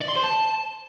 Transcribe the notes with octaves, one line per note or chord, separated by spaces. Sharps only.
D5
C6
C5
A5